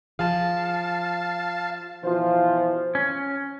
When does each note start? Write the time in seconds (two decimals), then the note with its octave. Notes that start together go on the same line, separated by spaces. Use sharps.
0.19 F3 G#4 F5 A5
2.04 B2 E3 F3 F4 C5
2.95 C#4